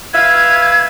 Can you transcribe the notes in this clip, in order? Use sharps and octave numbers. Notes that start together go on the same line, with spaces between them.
B4 E5 F5 G#6